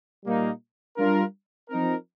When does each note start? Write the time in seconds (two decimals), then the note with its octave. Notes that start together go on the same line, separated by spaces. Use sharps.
0.24 A#2 G3 A#3 D#4
0.97 G3 D4 F4 A#4
1.69 F3 C4 D#4 A#4